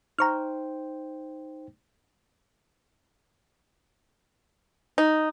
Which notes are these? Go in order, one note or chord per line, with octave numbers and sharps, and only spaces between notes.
D#4 C5 G5 A#5 C#6 F6
D#4